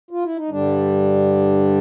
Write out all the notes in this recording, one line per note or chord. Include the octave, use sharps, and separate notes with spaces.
F4
E4
D#4
G2 D3 G3 D4